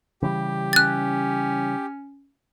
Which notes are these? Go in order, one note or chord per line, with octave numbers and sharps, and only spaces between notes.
C#3 E3 G3 G4
C#4 F#6 A6